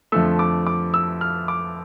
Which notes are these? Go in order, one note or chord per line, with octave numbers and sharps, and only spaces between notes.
F2 D3 F3 A3 E6
D6
D6
E6
F6
D6